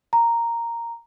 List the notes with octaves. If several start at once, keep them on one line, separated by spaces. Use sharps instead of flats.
A#5